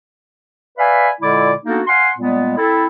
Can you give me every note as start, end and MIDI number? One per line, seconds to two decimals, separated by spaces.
0.77 1.08 71
0.77 1.08 74
0.77 1.08 76
0.77 1.08 77
0.77 1.08 80
0.77 1.08 83
1.21 1.53 46
1.21 1.53 50
1.21 1.53 56
1.21 1.53 64
1.21 1.53 74
1.21 1.53 86
1.66 1.81 58
1.66 1.81 59
1.66 1.81 62
1.66 1.81 63
1.66 1.81 66
1.66 1.81 69
1.87 2.09 77
1.87 2.09 78
1.87 2.09 80
1.87 2.09 84
2.18 2.54 46
2.18 2.54 55
2.18 2.54 56
2.18 2.54 58
2.18 2.54 59
2.57 2.87 60
2.57 2.87 64
2.57 2.87 69